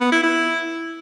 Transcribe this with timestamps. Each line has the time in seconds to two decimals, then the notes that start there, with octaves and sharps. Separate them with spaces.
0.01 B3
0.12 E4
0.23 E4